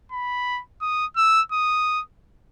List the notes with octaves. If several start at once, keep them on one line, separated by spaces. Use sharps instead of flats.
B5
D#6
E6
D#6